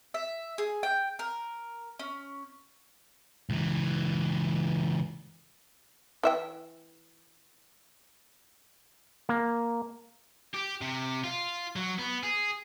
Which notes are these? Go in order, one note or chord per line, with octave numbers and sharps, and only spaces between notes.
E5
G#4
G5
A#4
C#4
C#2 E3
E3 E5 G5
A#3
G4
C3
F4
F#3
B3
G#4